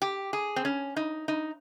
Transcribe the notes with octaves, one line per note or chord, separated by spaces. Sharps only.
G4
G#4
C4
C#4
D#4
D#4